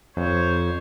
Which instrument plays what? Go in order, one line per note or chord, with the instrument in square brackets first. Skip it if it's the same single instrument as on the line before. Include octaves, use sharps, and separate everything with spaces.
[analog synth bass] F2 [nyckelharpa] C5 C#5